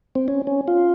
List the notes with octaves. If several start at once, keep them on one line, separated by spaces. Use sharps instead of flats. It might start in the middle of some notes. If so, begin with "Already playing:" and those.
C4
C#4
C#4
F4